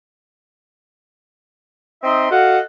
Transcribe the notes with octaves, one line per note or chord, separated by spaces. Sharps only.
C4 D#4 D#5 E5 C6 D#6
F#4 A4 D#5 F5 F#5